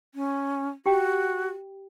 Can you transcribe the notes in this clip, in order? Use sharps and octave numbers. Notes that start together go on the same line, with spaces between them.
C#4
F#4 G4 G5